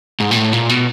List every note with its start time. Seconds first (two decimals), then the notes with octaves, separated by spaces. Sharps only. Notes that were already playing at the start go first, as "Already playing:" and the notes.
0.20 G#2
0.31 A#2
0.36 A2
0.53 A#2
0.69 B2